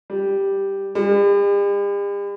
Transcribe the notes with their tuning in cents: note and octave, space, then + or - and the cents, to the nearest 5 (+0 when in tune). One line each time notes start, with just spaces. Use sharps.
G3 +0
G3 +45